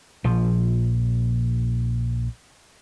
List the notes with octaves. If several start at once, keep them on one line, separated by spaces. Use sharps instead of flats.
A#1 F3